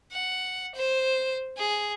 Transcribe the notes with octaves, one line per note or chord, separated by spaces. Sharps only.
F#5
C5
G#4